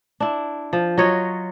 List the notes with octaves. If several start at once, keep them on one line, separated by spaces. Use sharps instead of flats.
D4 E4
F3
F#3 F4 C#5 D#5